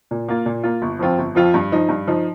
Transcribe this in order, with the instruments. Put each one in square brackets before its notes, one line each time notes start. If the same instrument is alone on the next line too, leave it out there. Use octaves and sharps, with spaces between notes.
[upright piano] A#2
A#3 F4
A#2
A#3 F4
G1
F2 F3 C4 F4
G1
F2 F3 C4 F4
G2
F3 D#4
G2
F3 D#4